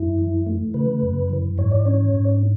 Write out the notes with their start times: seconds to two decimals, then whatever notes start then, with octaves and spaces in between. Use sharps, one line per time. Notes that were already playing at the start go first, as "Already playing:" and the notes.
Already playing: F#2 E4
0.18 E3
0.46 A3
0.74 C#3 B4
1.02 F#2
1.30 E3
1.58 G#2 C#5
1.71 D5
1.86 C#4 C#5
2.14 G#2